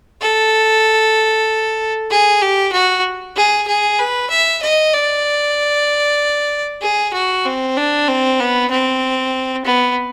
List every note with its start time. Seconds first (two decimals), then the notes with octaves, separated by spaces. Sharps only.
0.21 A4
2.10 G#4
2.41 G4
2.73 F#4
3.36 G#4
3.67 G#4
3.99 B4
4.30 E5
4.62 D#5
4.93 D5
6.82 G#4
7.14 F#4
7.45 C4
7.77 D4
8.08 C4
8.40 B3
8.71 C4
9.65 B3